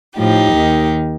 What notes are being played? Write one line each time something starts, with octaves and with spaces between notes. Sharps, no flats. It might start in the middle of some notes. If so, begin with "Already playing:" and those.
A2 F3 D#4 G4
D#2 D#3